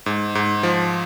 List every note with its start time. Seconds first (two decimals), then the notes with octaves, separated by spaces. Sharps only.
0.06 G#2
0.35 G#2
0.63 F3